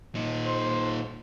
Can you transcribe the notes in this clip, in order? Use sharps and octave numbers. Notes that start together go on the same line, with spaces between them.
A#2 D#4
C5